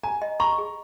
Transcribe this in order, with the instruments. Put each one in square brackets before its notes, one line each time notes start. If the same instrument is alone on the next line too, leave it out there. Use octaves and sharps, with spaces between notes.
[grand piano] G#5 [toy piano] A#5
[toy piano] D#5
[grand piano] A#5 [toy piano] C#6
[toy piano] G#4